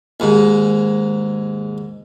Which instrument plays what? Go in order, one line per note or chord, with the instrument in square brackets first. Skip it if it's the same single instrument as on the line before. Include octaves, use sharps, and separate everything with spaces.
[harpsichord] D#2 G#2